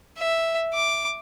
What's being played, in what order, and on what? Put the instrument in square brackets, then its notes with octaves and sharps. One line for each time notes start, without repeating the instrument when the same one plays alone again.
[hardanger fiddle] E5
D6